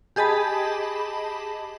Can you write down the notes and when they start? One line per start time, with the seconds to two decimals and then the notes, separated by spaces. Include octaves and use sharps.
0.16 G4 G#4 D#5 A5 B5